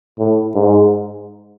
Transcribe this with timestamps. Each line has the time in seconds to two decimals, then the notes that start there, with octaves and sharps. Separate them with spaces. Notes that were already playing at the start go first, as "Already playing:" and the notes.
0.19 A2
0.55 G#2